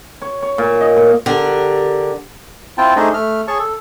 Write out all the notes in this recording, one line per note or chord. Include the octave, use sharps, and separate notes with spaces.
C#5
C#5
A#2
D#5
A#2
D3 G4 A#4
C4 E4 F4 G5 A5
A3 D4 D#4 G#4 C5 D#5
A3 F6
G#4 C#5 A5 C#6
A4